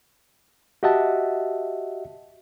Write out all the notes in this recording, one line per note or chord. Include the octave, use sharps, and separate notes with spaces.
F#4 G4 D#5 E5 F#5 A5